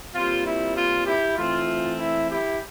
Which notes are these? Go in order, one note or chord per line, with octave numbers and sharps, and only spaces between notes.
A#2 G3 C4 F4
E4
F4
E4 G4
E3 A3 C4 F4
E4
E4 G4